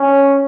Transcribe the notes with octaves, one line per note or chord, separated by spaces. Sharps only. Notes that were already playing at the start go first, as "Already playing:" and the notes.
Already playing: C#4